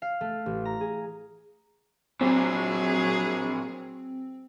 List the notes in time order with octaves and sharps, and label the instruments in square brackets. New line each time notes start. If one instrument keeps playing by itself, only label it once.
[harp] F5
A3
A1
A#5
G#4
[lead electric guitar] A#2 D4 [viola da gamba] F#3 G#4 [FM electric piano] C4